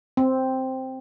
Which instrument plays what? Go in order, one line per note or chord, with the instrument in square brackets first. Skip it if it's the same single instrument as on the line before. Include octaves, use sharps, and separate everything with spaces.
[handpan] C4